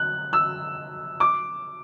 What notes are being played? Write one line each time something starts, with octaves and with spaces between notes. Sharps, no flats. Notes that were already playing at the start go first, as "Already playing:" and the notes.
Already playing: F#6
E6
D6